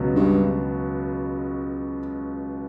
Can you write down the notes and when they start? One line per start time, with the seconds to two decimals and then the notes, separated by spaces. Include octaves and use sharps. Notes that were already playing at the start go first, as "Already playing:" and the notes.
Already playing: C#2 B2 F#3
0.15 G2